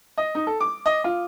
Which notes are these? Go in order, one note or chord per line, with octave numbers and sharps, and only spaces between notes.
D#5
D#4
A4
D6
D#5
F4